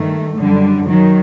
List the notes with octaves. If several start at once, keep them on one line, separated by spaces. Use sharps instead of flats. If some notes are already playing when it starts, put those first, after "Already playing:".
Already playing: G2 D#3 A3
F#2 D3 G3
D#3 F#3